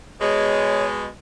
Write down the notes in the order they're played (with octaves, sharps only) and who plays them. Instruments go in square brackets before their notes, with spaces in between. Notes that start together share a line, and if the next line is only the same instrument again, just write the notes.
[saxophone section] B2 G#3 [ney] C#5